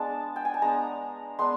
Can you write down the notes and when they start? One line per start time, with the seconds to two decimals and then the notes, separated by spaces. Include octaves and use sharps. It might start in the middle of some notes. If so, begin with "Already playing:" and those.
Already playing: G#3 B3 D4 A5
0.36 G5
0.45 G#5
0.54 A5
0.62 G#3 B3 D4 A#5
1.39 G#3 B3 D4 C6